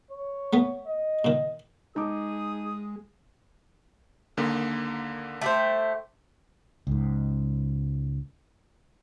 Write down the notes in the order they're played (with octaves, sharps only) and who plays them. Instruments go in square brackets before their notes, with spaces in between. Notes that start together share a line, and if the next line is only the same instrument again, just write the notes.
[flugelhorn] C#5
[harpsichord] A3 B3
[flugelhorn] D#5
[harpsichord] A#2 D#3
[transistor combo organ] G#3 [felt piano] D#4 A5 D6 [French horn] G#4 [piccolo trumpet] D#6
[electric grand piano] D#2 D3 A#3
[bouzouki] A3 G4 C5
[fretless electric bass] C#2 G#2